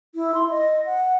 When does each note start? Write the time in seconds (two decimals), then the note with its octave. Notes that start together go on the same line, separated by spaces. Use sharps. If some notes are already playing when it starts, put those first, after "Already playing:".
0.15 E4
0.35 C6
0.50 D#5
0.86 F#5